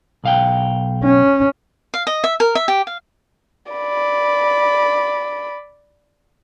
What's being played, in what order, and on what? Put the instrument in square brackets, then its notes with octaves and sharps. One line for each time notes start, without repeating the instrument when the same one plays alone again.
[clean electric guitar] B1 F5 G5
[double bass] C#4
[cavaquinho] F5
D#5
E5
A#4
E5
G4
F5
[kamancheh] D5 B5